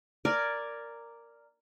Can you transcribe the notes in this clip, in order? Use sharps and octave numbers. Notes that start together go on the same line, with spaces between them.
A#4 D5 G#5